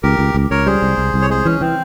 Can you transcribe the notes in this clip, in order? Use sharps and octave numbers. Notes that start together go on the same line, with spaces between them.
C#2 G4 A#4
C#2
C#2
C#2 A#4 C#5
G3 G#4 C5
C2
C2
C2
C#5
G#3 G#4 C5
E3 C#4
E3 C4